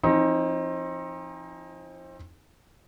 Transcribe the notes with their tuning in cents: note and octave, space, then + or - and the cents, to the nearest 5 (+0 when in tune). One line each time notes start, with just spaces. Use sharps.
F3 -35 C4 +35 D#4 +15